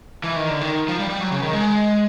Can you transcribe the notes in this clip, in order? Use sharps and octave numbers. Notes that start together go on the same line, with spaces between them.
E3
D#3
D3
D#3
F3
G3
G3
F#3
C#3
D#3
G#3